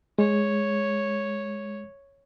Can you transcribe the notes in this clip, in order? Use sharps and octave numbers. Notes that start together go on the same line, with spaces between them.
G#3 C#5